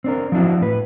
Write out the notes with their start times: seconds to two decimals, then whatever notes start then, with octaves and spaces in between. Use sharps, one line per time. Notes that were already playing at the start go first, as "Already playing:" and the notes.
0.04 C4 D4 A#4
0.32 F3 C4 D4 E4 F#4
0.61 A2 B4